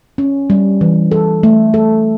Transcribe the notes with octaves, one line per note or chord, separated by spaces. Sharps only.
C#4
G3
E3
A4
A3
A4